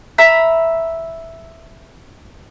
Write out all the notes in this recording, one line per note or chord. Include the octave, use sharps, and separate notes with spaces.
E5 A#5 B5